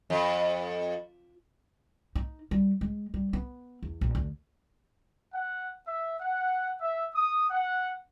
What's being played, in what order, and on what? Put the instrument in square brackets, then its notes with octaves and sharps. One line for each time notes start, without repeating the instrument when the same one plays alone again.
[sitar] F2
[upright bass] D#4
G3
G#3
G3
B3
E2
A#1
D2
[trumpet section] F#5
E5
F#5
E5
D#6
F#5